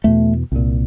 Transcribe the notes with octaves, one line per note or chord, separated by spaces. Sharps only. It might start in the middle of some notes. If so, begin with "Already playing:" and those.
E2 B2 A3
C2 A#2